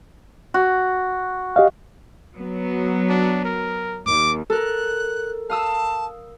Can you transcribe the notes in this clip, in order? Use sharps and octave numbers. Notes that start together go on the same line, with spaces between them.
F#4
G4 D#5 F5
F#3 B3
D4
A#4
D#2 D6
A4 A#4 F#6
F5 A5 D#6 E6